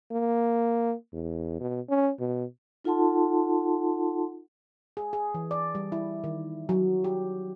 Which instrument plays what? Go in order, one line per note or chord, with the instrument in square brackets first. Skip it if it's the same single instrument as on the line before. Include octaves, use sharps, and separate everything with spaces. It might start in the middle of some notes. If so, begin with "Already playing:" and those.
[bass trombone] A#3
E2
B2
C#4
B2
[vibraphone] D#4 F4 A4 F#5 A5 C6
[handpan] G#4
G#4
E3
D5
G3
E4
D#3
F#3
G4